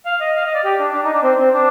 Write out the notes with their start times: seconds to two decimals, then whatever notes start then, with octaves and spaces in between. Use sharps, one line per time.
0.05 F5
0.21 D#5
0.36 F5
0.46 D#5
0.54 D5
0.65 G4
0.79 D4
0.94 D4
1.05 D#4
1.13 D4
1.23 C4
1.39 C4
1.54 D4